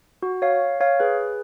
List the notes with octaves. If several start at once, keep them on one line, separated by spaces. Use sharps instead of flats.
F#4
C#5 F5
C#5 F5
G#4 B4